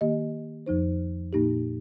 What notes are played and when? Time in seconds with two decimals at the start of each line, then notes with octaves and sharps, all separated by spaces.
0.01 D#3 A#3 G4 D#5
0.67 F2 F3 D#4 C5
1.33 A#2 A#3 D#4 G4